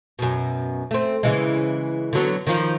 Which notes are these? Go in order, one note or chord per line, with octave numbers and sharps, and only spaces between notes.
F#2 B2
A3 C4
C#3 E3 G#3
D3 F#3 B3
D#3 F3